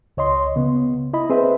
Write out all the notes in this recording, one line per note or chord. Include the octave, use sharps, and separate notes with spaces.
C#2 C#5 D#5 C6
C#3 B3
E4 D#5 B5
C4 G#4 B4 C5 E5